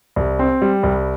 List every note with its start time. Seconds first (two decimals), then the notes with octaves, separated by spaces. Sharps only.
0.16 C2
0.39 C4
0.62 G3
0.83 C2